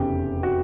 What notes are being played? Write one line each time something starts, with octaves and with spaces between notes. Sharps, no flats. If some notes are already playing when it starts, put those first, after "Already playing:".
Already playing: F1 E2 C#3 G4
F#4